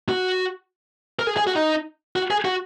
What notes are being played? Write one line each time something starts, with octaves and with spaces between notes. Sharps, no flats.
F#4
A#4
G#4
G#4
F#4
D#4
F#4
G#4
F#4